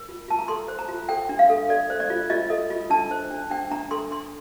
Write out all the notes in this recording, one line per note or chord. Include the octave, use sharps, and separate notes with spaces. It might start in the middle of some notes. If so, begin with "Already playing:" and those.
Already playing: A#4
F4
F4 A5
A#5
A4 C6
C5
A#5
F4
A4 G5
D4
F5
A4
A4 D5
C5
D5
F4
F4 D#5
A4 D#5
F4
D4 A5
C5
D4
D4 G5
D4 A#5
A4 C6
D4 C6